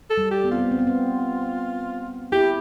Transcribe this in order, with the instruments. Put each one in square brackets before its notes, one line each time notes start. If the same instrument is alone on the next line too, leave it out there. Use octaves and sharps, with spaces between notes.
[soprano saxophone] A4
[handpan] G3
[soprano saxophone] G4
[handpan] B3
[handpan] C4 [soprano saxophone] F4
[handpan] B3
C4
B3
C4
[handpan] E4 [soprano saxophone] G4